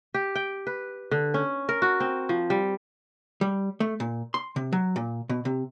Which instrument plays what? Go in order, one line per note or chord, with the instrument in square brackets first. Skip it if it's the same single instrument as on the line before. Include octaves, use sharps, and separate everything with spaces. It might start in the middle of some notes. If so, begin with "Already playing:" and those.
[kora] G4
G5
B4
D3
C#4
A#4
F#4
C4
F3
G3
[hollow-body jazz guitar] G3
A3
A#2
C6
C3
F#3
A#2
B2
C3